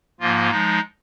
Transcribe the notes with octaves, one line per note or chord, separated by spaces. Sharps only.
G#2 F3 A#3 F4
F3 G#3 D#4